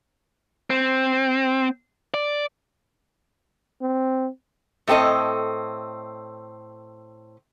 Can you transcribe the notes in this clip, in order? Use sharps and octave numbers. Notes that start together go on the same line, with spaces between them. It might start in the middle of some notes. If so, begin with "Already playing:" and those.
C4
D5
C4
A2 A3 C4 A4 D#5